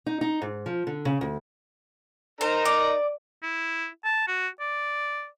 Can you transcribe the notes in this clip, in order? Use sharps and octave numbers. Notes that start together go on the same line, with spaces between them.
D#4
D#4
G#2
F3
D3
C#3
D2
D#4 A#4 C5 A#5
D5
E4
A5
F#4
D5